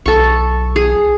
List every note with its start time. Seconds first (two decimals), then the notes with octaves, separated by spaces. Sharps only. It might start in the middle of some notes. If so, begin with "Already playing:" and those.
0.06 B1 A4 C#6
0.76 G#4